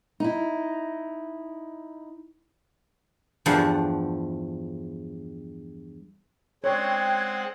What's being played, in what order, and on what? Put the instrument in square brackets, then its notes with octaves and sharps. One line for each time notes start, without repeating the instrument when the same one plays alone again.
[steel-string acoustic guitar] D#4 E4
[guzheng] E2 G2 F3 A3 F#5
[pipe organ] G#3 C4 F#5 [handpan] C#5 D5 [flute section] G5 G#6